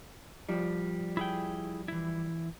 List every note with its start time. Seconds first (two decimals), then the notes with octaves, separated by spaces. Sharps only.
0.49 F3 G3
1.17 E4 G#4 G5
1.88 E3 E4